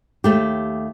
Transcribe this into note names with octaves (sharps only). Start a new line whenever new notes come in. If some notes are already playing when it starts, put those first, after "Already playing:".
D#2 A3 G4